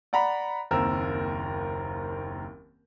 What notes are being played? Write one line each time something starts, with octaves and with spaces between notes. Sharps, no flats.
D5 F#5 A#5 B5
F#1 D#2 C4 A#4 E6